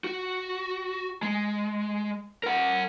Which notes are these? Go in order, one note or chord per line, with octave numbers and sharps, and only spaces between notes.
F#4
G#3
A#4 F#5